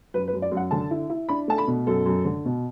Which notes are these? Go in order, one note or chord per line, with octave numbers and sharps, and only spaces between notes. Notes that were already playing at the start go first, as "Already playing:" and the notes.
F#2 B4
B4
F#2
D5
F#2
F#5
D3 A5
E4
E4
D4 B5
A3 A5
B5
B2
F#2 A4
F#2
D3
B2